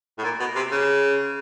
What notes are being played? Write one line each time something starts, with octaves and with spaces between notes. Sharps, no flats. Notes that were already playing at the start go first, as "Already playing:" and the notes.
A2
A#2
B2
C3
C#3